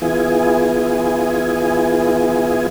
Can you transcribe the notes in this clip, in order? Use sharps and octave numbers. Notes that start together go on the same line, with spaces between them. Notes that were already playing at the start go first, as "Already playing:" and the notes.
E3 B3 E4 F4 G#4 G#5